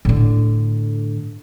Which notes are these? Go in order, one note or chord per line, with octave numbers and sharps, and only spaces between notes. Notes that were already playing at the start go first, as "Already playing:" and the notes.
A2 D3